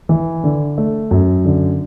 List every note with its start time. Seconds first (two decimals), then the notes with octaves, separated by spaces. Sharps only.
0.09 E3
0.44 D3
0.78 A3
1.11 F#2
1.45 D3